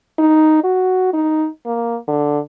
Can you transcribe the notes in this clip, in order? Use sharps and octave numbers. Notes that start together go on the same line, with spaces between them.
D#4
F#4
D#4
A#3
D3